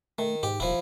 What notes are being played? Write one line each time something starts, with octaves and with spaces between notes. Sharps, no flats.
D#3 A3
G#2 G4
D#1 F3 E4